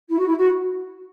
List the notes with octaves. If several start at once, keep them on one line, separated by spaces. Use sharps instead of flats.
E4
F#4
E4
F#4